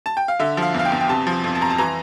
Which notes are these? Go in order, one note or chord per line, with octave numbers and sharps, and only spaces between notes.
A5
G5
F5
D3 E5
F3
F5
E2
F5
G5
E2
G5
C3 A5
F3
F2
A5
F2 A#5
A5
E3 A#5